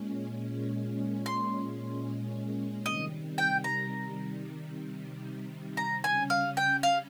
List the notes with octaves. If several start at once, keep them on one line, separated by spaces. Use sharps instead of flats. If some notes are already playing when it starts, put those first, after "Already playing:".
Already playing: A#2 G#3 C#4
C6
C3 D#3 G3 D#5
G5
A#5
A#5
C#3 G3 C#4 G#5
F5
G5
F5